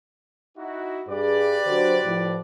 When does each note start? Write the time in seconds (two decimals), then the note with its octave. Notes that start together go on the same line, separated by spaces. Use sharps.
0.57 D#4 E4 F#4
1.08 G2 G4 G#4 B4 D5
1.66 D3 F#3 C5
2.05 A2 F3